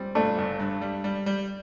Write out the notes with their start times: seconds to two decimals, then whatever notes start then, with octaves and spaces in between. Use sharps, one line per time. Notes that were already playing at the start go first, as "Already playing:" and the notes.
Already playing: G3 C4
0.15 G2 A3 D4
0.38 G1
0.60 G2
0.81 G3
1.04 G3
1.26 G3